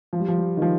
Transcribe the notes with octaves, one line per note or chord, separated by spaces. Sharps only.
F3
G3
F3
G3
D#3
F3